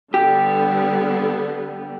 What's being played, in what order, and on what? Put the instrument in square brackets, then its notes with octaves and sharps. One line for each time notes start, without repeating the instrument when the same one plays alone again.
[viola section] D3 G3 B3 [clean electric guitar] G4